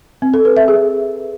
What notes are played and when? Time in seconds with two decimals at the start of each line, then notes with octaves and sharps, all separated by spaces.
0.22 C4
0.34 A4
0.45 B4
0.57 E5
0.68 G#4